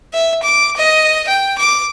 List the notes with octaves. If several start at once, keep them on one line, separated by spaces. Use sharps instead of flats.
E5
D6
D#5
G5
D6